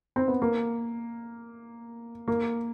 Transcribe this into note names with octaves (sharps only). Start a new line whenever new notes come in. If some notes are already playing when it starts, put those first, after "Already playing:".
C4
B3
A#3
A#3